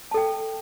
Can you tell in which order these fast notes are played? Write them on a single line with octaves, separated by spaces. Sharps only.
A5 A4 G5